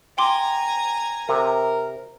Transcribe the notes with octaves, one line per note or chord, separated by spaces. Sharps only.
G5 G#5 A#5 C6 D6
C3 A#4